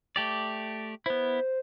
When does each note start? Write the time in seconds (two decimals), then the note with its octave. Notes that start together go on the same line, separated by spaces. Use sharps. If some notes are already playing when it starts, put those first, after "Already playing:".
0.16 A3 G4 D5
1.06 B3 E4 C5